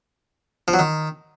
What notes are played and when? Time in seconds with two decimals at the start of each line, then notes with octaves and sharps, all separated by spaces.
0.68 F3
0.73 F#3
0.79 D#3